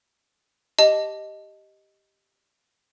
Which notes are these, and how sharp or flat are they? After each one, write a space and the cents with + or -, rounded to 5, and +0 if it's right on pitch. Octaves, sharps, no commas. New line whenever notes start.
G4 +0 D#5 +0 A5 +0